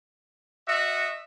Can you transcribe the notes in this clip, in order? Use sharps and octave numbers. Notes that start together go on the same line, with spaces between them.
F#4 D#5 E5